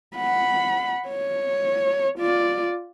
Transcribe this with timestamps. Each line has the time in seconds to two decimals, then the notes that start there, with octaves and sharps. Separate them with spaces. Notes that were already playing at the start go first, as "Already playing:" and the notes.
0.16 F#5 B5
1.08 C#5
2.19 F4 D5